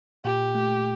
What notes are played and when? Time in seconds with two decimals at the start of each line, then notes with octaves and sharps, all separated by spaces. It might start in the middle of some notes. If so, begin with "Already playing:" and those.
0.25 A#2 G4
0.55 A3